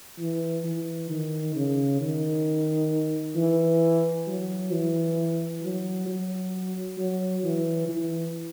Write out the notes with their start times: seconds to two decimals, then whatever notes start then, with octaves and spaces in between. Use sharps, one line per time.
0.19 E3
0.65 E3
1.10 D#3
1.55 C#3
2.01 D#3
3.36 E3
4.27 F#3
4.71 E3
5.63 F#3
6.08 F#3
6.98 F#3
7.44 E3
7.89 E3